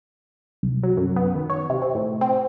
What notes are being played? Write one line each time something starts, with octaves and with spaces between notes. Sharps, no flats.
C2
F#3
F#2
B3
D#3
C#5
C3
C4
A2
C4